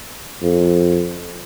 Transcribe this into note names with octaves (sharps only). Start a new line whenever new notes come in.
F2